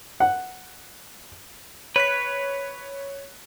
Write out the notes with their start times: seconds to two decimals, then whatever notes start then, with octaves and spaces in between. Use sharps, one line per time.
0.20 F#5
1.96 B4 C#5 F#6 B6